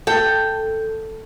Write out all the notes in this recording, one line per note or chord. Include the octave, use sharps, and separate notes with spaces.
A4 G5